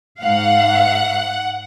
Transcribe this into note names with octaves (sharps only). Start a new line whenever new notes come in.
G#2 F5 F#5